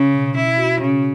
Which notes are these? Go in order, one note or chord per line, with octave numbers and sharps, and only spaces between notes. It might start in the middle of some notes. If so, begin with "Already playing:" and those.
Already playing: C#3 C#4
B2
C#4 E4
F#4
C#3 C#4